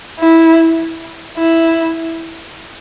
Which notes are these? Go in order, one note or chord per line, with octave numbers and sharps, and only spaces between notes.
E4
E4